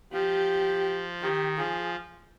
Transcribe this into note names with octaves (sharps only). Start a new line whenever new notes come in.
F3 G4
D#3 G4
F3 G#4